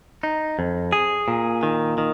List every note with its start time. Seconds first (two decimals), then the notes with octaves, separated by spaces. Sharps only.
0.23 D#4
0.59 F2
0.93 G#4
1.28 A#2
1.63 D#3
1.98 D#3